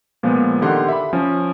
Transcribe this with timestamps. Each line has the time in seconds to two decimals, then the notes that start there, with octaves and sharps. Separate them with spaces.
0.23 A#2 F3 G#3 B3
0.62 D3 D#3 G4 F#5 C6
0.88 E5 B5
1.13 F3 C#4